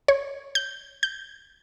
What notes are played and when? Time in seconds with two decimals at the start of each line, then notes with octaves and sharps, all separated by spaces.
0.08 C#5
0.55 G6
1.03 G6